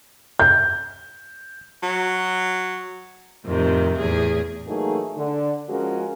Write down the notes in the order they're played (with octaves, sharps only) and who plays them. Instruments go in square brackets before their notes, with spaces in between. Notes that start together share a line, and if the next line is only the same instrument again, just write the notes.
[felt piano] G6
[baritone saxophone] F#3
[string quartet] F2 A2 C3 D#3
E2 A2 G#4
[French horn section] E3 F#3 A3 A#3 D#4 G#4
D3
F3 G#3 C#4 F#4 G#4 A#4